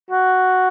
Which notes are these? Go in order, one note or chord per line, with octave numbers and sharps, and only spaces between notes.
F#4